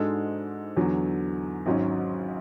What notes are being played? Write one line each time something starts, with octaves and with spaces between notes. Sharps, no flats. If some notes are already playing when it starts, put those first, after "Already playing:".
Already playing: G#2 G#3 D4 F#4 A4
E2 D3 F#3
G#1 G#2 F#3 C#4